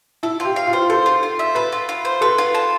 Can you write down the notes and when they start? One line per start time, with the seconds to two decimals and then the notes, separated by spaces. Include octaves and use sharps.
0.23 E4 A4
0.40 F4
0.45 G4
0.56 F5
0.67 F4
0.73 C5
0.90 A4 C5
1.06 F4
1.23 F4
1.39 E5
1.55 A4 B4
1.72 F4
1.89 F4
2.05 C5
2.21 A4 B4
2.38 F4
2.55 A5